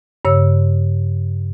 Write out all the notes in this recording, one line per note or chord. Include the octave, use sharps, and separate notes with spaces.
G2 C#3 C#5 E6